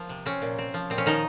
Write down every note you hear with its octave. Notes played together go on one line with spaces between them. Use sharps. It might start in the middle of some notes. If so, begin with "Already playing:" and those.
Already playing: F3 A#3
C3
C4 C#4
A#2
C4
F3
A#2 C4
C#4
D#3 F3 D#4